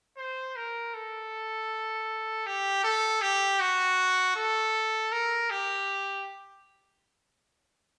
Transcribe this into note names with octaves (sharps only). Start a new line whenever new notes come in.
C5
A#4
A4
G4
A4
G4
F#4
A4
A#4
G4